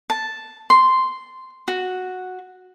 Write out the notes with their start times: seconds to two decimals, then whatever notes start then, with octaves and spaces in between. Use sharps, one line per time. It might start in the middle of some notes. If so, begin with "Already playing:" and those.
0.10 A5
0.70 C6
1.68 F#4